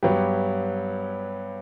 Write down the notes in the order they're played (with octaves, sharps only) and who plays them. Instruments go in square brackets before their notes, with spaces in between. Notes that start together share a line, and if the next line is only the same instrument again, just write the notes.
[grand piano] G2 F#3 B3 G4